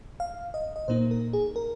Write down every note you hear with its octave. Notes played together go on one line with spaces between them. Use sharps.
F5
D#5
D#5
A#2 A#3 D#4 C5
A#4
G#4
A#4